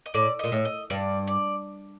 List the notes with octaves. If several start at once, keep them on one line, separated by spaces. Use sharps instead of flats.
D#5
A2 D5
A#2 D#5
A2
D#5
G2 D5
D5